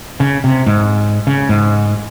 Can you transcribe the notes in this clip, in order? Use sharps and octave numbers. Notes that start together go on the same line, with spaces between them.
C#3
C3
G#2
C#3
G#2